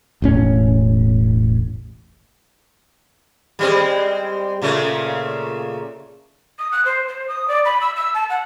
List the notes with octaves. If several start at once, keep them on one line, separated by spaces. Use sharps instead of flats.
E1 A1 C#4
G3 G#3 C4
A#2 C#3 A3
D#6
F#6
C5
C5
D#6
D5
B5
E6
E6
A5
F#5